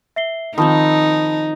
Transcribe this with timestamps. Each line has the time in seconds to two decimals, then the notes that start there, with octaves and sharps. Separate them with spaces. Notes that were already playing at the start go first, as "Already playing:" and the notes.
0.16 E5 C7 G7
0.58 D#3 F3 C4 D#4 A5 B5 D#6